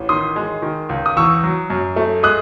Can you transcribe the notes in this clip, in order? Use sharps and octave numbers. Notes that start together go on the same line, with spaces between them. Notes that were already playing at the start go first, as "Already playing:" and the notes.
Already playing: A1
D#3 C6 D#6
G#3
D#3
C#2
D#6
E2 C#6 E6
F#3
F#2
A3
G#3 D#6 F#6